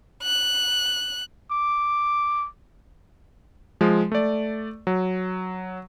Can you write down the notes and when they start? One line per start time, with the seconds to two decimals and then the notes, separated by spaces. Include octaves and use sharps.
0.23 F#6
1.51 D6
3.81 F3 G#3
4.12 A3 D5
4.87 F#3